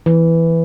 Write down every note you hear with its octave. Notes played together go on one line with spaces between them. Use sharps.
E3